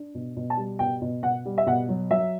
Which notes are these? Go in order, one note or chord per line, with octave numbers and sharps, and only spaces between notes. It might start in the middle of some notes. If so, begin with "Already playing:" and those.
Already playing: D4
B2
B2
A5
G3
B2 G5
B2
B2 F#5
G3
E5
B2 F#5
F#3
F#3 E5